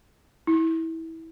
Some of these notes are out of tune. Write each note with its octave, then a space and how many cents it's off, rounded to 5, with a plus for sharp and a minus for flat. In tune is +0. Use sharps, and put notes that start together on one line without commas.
E4 -20